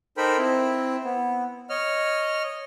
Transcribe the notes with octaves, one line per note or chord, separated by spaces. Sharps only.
D#4 A4 A#4 C5 G5 B5
C4 E4
B3
C#5 D#5 F6